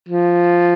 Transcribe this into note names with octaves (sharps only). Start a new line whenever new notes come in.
F3